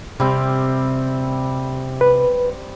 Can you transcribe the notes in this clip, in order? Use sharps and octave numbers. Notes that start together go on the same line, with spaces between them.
C3 G3 C4
B4